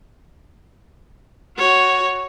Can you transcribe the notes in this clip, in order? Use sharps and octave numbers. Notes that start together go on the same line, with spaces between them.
F#4 C#5